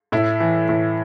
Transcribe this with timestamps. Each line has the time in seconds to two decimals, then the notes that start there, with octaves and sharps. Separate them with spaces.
0.12 A2 E4
0.40 E3
0.69 A2